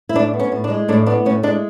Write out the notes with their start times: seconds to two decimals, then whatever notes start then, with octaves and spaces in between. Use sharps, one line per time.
0.09 E4
0.15 A2 D4
0.33 B3
0.40 C#4
0.52 A2
0.64 D4
0.70 G#3
0.88 A2 D4
1.06 B3 D4
1.25 A2 C#4
1.43 G#3 D4